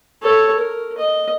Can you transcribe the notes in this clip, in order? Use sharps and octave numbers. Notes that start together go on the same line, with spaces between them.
A4 C#5
A#4
D#5